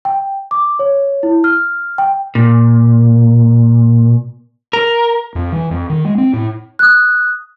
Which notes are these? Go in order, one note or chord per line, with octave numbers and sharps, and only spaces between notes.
G5
D6
C#5
E4
F6
G5
A#2
A#4
F2
E3
F2
D#3
G#3
C4
A2
D#6 F#6